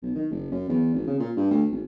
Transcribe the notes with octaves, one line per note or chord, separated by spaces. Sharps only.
B1
D#3
F#1
F#2
E2
G#1
C#3
A#2
G2
D2
G#1